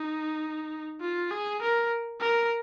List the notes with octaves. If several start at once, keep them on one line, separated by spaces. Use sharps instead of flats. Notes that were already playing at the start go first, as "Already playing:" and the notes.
Already playing: D#4
F4
G#4
A#4
A#4